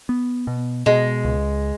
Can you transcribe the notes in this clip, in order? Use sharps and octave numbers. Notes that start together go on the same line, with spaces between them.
B3
B2
B2 G#3
C#2